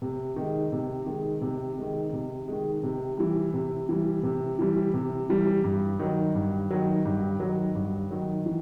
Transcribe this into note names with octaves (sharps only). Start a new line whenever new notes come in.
C3
D#3 G#3
C3
D#3 G#3
C3
D#3 G#3
C3
D#3 G#3
C3
E3 G3
C3
E3 G3
C3
E3 G3
C3
E3 G3
G2
D#3 F#3
G2
D#3 F#3
G2
D#3 F#3
G2
D#3 F#3
E3